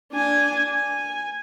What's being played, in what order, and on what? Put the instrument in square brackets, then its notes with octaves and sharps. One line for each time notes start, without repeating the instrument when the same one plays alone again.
[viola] D4 G#5
G#5